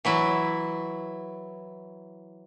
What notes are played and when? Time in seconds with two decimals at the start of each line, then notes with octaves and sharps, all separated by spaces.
0.05 E3 F#3 E4